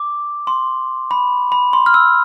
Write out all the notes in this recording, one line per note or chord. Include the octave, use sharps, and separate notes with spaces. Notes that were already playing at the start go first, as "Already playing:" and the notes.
Already playing: D6
C6
B5
B5
C6
F6
E6